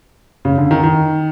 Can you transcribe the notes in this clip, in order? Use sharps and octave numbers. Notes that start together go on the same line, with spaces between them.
C#3
D3
D#3
D#3